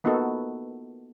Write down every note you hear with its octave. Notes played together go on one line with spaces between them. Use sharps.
A#3 B3 D#4 F4 F#4 A4